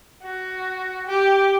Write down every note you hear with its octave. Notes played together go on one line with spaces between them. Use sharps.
F#4
G4